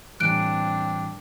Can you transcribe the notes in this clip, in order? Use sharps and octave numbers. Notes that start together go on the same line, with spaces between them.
A2 E3 G3 C4 D4 F#6 D7